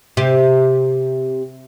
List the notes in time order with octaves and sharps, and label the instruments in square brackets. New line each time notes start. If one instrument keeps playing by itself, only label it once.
[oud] C3 G4